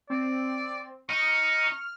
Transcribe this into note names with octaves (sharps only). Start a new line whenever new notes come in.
C4 D5
D#4 C#6 F6